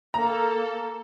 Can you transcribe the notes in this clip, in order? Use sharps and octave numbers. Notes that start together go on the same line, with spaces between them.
A#3 A4 A#5